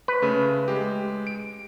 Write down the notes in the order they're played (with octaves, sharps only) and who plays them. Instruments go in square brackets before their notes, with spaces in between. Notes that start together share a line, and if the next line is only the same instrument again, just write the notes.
[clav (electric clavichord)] B4
[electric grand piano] C#3 A3
G#3 G4
D7